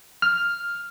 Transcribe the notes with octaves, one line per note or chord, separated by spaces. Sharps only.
F6